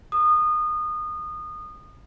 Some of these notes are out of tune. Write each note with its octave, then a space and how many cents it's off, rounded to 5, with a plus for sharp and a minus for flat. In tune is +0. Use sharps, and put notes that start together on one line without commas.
D#6 -25